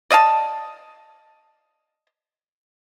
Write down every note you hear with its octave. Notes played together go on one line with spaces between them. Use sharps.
D5 D#5 F5 A5